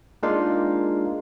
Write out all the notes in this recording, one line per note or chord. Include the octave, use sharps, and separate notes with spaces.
G#3 A#3 D4 D#4 F4 F5